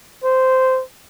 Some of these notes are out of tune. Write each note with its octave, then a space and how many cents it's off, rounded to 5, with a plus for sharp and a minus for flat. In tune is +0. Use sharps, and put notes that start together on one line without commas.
C5 -10